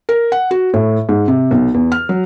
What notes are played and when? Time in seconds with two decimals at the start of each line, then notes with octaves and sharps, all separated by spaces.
0.09 A#4
0.32 F#5
0.51 F#4
0.74 A2
1.09 G#2
1.28 C3
1.51 B1
1.74 E2
1.92 F6
2.09 F#3